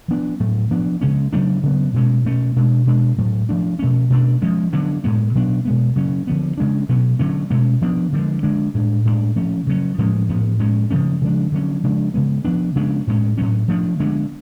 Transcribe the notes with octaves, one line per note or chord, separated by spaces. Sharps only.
F3 B3 D4
A2 F#3 A3
F3 B3 D4
C#3 G#3 C#4
C#3 F#3 A3 D4
C#3 F#3 B3
B2 G#3 C#4
B2 A3 C#4
B2 G#3 D4
B2 G#3 D4
A2 F#3 A3
F3 A3 D4
B2 A3 C#4
B2 A3 D4
F3 G#3 C#4
D3 F#3 B3 D4
A2 G#3 B3
B2 F#3 B3 D4
B2 G#3 B3
C#3 F#3 C#4
D3 F3 B3
C#3 G#3 D4
B2 F#3 B3
D3 F#3 A3 C#4
B2 G#3 C#4
F3 B3 D4
D3 F3 G#3
D3 G#3 D4
A2 G#3 D4
A2 G#3 B3 D4
F3 A3 C#4
C#3 F#3 C#4
A2 F3 G#3 C#4
A2 F3 B3
A2 G#3 C#4
C#3 F3 A3 C#4
C#3 F3 G#3 D4
D3 F#3 C#4
C#3 F3 G#3 D4
C#3 G#3 B3
F3 B3 D4
C#3 G#3 B3 D4
A2 G#3 C#4
A2 F#3 C#4
F3 A3 D4
D3 G#3 B3 D4